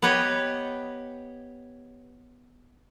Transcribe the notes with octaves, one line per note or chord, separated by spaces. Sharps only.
B3 G4 B4 C#5 D#5